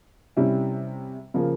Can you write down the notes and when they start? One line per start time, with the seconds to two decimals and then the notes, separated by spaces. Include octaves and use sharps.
0.37 C3 G3 C#4 E4
1.34 C#3 F3 A#3